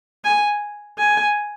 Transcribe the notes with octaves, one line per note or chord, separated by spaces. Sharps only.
G#5
G#5